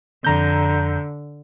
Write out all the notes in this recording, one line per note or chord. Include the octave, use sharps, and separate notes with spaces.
F2 D3 A#5 G6